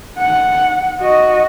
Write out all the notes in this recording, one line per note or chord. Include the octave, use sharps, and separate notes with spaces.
F#5
F#4 D#5